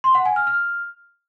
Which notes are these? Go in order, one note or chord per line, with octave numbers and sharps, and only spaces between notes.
C6
F#5
G#5
F6
F6